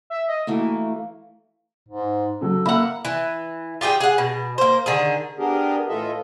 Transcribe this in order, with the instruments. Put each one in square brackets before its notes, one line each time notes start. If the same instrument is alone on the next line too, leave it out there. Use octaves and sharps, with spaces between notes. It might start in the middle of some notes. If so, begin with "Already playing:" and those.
[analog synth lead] E5
D#5
[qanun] E3 A#3 F#4 [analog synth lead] A3
[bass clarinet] G#2
[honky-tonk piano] C#3 F#3 [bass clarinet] A4
[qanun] A#3 F#5 [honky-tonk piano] E5 B5 E6
[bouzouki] E3
F4 G4 G#4 G5
G#4 F#5
B2
A#3 C5
D3 D#3 G#4
[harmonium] B3 D4 G4 G#4 A#4
A2 E3 F4 A4 D#5 E5